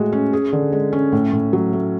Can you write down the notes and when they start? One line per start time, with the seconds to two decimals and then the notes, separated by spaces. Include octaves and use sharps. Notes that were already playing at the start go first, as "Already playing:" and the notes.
Already playing: A2 G#3 F#4
0.12 C#4
0.33 G#4
0.53 D3
0.73 G#3
0.93 C#4
1.12 A2
1.33 A2
1.53 F#3
1.73 A3